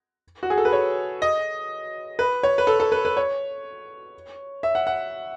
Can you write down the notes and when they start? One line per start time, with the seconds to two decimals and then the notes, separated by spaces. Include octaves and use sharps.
0.43 F#4
0.50 G#4
0.58 A4
0.65 B4
0.73 C#5
1.22 D#5
2.19 B4
2.43 C#5
2.58 B4
2.67 A4
2.80 A4
2.92 B4
3.05 B4
3.17 C#5
4.63 E5
4.75 F#5
4.87 F#5